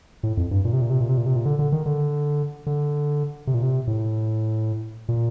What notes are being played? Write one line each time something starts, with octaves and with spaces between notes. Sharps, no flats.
A2
F2
G2
A#2
C3
A#2
C3
A#2
C3
A#2
C3
A#2
D3
D3
D#3
D3
D3
C3
A#2
C3
A2
A#2